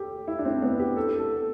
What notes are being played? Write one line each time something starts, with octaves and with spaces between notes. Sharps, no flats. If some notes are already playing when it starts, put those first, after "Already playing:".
Already playing: G4 A4
E4
D4
C4
B3
G4
A4
A4